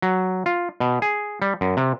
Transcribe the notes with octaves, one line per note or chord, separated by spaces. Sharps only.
F#3
F4
B2
G#4
G3
F#2
C3